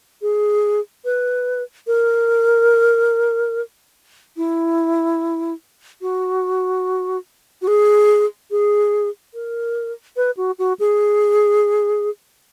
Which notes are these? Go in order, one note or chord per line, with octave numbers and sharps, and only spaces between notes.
G#4
B4
A#4
E4
F#4
F#4
G#4
G#4
A#4
B4
F#4
F#4
G#4